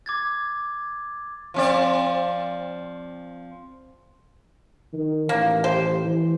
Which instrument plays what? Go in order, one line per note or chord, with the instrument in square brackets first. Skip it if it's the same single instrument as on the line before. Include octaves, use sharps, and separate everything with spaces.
[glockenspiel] D6 G#6 A6
[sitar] F3 C4 D5
[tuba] D#3
[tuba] A1 [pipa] A#3
[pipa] G4 C5
[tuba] E3